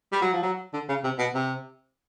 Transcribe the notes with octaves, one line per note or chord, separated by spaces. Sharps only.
G3
F#3
F3
F#3
D3
C#3
C3
B2
C3